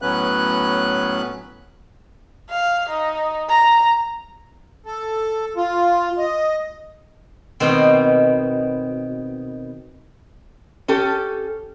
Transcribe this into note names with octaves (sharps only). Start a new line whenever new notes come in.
A2 F#3 B3 C#4 B4 F#6
F5
D#4
A#5
A4
F4
D#5
B2 D#3 C4
C#4 G4 A4